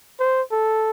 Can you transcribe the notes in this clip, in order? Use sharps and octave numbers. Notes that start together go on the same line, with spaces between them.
C5
A4